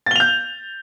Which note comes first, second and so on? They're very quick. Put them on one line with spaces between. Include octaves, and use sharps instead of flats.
A6 G7 F7 G6